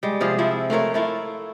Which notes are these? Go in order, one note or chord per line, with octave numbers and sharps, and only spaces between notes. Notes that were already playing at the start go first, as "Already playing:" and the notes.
G3 G#3
C3 F3 F4 G#4
F3 C4 E4
A3 F4 A#4 C#5
A3 E4 F4